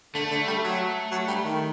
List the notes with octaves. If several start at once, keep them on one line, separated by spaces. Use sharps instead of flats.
D3 A3
D3
G3
F#3
F#3
G3
D#3